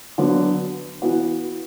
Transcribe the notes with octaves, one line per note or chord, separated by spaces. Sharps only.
D3 F#3 B3
E3 B3 F#4